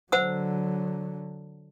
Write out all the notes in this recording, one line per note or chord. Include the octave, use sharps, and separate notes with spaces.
D3 F#3 C5 F#5 E6